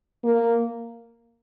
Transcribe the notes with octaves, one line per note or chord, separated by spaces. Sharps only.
A#3